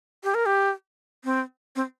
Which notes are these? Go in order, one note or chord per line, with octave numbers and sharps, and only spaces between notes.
G4
A#4
G4
C4
C4